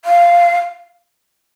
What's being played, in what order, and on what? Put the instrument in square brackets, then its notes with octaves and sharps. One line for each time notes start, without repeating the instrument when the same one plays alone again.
[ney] F5